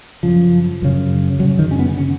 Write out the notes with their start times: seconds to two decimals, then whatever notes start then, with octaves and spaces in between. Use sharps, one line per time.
0.23 F#2 C#3 F3
0.82 F#2 C#3
1.39 F#2 F#3
1.43 C#3
1.59 D#3
1.71 C#4
1.79 B3
1.98 C#3 C#4